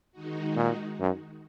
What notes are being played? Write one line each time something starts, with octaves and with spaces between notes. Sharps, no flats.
D#3 G#3 D#4 F#4
A#2
F#2